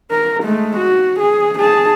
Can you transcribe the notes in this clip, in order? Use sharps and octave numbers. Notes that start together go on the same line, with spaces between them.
A#4
G#3 A3
F#4
G#4
G#4 A5